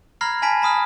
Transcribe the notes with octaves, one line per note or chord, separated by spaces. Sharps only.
A#5 B5 F6 G#6 A#6 C7
G#5 A5 B5 B6 D7
A5 B5 D#6 F6